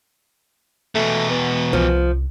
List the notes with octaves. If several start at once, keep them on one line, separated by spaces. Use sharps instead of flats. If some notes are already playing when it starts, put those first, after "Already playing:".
E2 B2 A3
B3
C2 F3